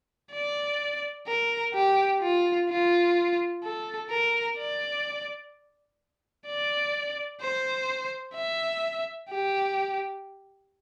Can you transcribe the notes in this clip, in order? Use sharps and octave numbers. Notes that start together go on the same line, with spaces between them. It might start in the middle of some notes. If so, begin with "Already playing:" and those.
D5
A#4
G4
F4
F4
A4
A#4
D5
D5
C5
E5
G4